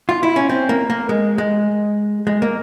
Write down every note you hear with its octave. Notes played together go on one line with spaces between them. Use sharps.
F4
E4
C#4
C4
A#3
A#3
G#3
G#3
G#3
A#3